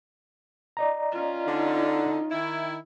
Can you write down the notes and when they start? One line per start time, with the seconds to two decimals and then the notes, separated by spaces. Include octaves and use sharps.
0.77 D5 D#5 A#5
1.12 C#4 F4
1.47 D3 D#4
2.31 D#3 E4